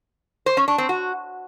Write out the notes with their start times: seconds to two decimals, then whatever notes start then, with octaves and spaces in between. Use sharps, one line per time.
0.46 C5
0.57 C#4
0.68 D4
0.78 C4
0.89 F#4